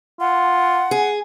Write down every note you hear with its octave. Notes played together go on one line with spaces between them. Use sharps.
F4 F#5
G#4